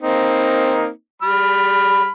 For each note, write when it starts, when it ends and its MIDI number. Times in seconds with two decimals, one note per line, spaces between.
0.02 0.89 58
0.02 0.89 60
0.02 0.89 63
1.22 2.10 55
1.22 2.10 83
1.22 2.10 89